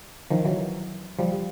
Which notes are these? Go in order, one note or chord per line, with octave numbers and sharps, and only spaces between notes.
D#3 F3
E3 F#3
F3 G3